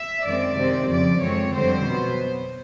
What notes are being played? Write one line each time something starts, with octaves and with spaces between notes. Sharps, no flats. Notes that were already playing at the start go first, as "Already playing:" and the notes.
Already playing: E5
F#2 D#3 G#3 C4 D5
C3 D#3 G#3 C4
F2 C#3 F3 D5
F#2 D3 F3 G#3 C4 C#5
F2 D3 G3 C4 C5
B2 F#3 B3